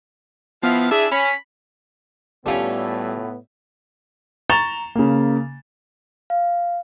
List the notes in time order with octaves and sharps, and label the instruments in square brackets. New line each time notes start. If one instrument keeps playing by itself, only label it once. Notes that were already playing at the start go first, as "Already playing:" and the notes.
[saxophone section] F3 E4 F5 [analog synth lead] B3
[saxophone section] D4 E4 E5 [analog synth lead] G#4
[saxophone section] C#4 [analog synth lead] B5
[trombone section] A2 B3 [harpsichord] G3 E5 [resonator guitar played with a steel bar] C#4 F4 A4
[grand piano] A#5 C#6 A6 E7 F7 G7
C#3 A#3
[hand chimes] F5